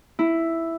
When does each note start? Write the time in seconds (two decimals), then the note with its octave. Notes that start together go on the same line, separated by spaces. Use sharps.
0.19 E4